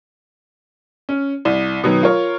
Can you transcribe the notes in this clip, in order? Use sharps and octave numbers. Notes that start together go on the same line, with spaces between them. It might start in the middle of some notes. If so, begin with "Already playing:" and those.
C#4
C2
B2 D#3 F#3 B3
F4 A#4 C#5